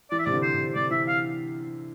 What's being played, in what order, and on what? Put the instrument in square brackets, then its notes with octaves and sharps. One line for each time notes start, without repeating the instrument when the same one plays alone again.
[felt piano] E3 [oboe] D5
[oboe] E5
[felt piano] C3 [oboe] D5
[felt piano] D3
[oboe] C5
[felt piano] C3
[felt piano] C3 [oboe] D5
[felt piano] E3 [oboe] E5
[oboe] F5